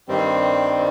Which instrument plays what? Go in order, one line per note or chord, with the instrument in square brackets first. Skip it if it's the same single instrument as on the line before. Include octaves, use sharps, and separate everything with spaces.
[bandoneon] G2 D#3 G3 C4